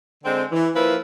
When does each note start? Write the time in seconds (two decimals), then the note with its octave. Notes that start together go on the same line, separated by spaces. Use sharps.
0.24 D3 G#3 C4
0.51 E3
0.75 F3 A#3 E4 B4